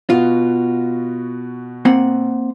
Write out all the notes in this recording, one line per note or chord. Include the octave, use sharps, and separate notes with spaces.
B2 B3 F4 F#4
A#3 C4 F#5